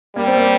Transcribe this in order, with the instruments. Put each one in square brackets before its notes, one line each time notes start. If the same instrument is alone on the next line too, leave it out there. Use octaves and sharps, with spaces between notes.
[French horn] G3 [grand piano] A#3
[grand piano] C4
A#3